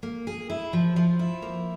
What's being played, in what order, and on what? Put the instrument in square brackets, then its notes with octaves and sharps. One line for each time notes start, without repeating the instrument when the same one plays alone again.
[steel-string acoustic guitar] A#3
G#4
E4
F3
F3
E4
A#3